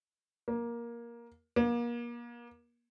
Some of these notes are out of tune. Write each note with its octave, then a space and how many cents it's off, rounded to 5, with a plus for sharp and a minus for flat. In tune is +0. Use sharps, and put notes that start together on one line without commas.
A#3 +15
A#3 +35